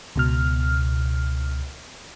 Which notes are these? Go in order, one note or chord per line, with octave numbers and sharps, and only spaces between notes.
C#2 B2 F6